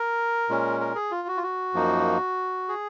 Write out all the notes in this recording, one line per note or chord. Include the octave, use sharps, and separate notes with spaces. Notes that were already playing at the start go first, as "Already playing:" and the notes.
Already playing: A#4
A#2 G#3 C#4
A#4
G#4
F4
F#4
F4
F#4
F#2 F3 A#3 D#4
G#4